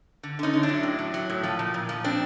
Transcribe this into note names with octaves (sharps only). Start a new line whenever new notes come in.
D3
D3 C#4 D#4
D3
D4 E4
F#3
A2
F#3
F#3
A2
F3
A#2
A#2
F3
C4 D4